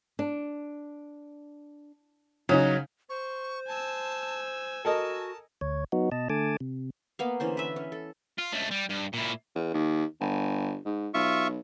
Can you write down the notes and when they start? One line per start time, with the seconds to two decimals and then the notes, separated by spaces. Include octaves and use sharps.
0.19 D4
2.49 C#3 F#3 C#4 D#4
3.09 C5 C#6
3.68 G#5 A5 E6
4.85 F#4 A4 A#4 D#5 A5
5.61 D2 C#5
5.92 F#3 B3 D#4 F#4
6.12 B2 D#5 A5
6.30 D3 A3 G#5 A5 D6
6.60 C3
7.19 A#3 B3 F5
7.40 D3 E3 C#4 C5
7.57 B4 E5
7.76 C#4
7.92 A4
8.38 F4
8.52 C#2 A3
8.71 G3
8.89 G2
9.13 A#2 E4
9.55 E2
9.74 D#2
10.20 G1
10.85 G#2
11.14 B1 F4 E5 C#6